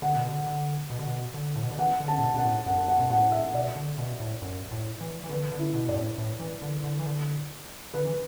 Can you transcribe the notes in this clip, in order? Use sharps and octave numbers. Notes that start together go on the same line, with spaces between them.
D3 F#5
B2
D3
D3
B2
D3
B2
D3
A2
B2
D3
E3 F#5
D3
A5
A2
B2
B2 F#5
A2
F#2 F#5
F#5
B2
A2 F#5
E5
B2 D5
D3
B2
A2
F#2
A2
E3
E3
D3 B4
D3
E4
B2
F#2 D5
A2
A2
E3
D3
D3
E3
D3
D3 B4
E3